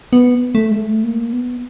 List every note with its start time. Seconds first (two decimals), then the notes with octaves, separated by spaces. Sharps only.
0.13 B3
0.55 A3
0.71 G#3
0.76 A3
1.04 A#3
1.33 B3